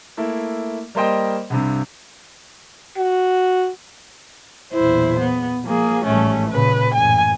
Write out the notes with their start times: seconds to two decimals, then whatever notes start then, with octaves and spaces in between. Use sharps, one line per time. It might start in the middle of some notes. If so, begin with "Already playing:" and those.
0.17 A3 A#3 E4
0.95 G3 A#3 A#4 C5 D#5 G5
1.50 C2 G2 C3
2.97 F#4
4.73 B1 E2 A#2 E4 C5
5.19 B3
5.66 F3 G#3 A#3 G#4
6.05 A1 G#2 G3 A3 C#4
6.50 A#2 C#3 B4
6.94 A1 F#2 A#2 G#5